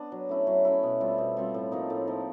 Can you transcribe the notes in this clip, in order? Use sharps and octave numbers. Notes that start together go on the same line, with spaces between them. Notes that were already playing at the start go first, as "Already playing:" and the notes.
Already playing: B3 D4
F#3
A3 C#4 E4
F#3
A3 C#4 E4
B2
G3 C4 F4
B2
G3 C4 F4
A2
F3 A#3 D#4
A2
F3 A#3 D#4